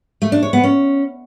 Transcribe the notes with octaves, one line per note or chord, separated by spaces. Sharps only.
A3
D4
C#5
B3
C#4